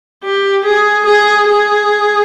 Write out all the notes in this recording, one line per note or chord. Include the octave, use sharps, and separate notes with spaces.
G4
G#4
G#4
G#4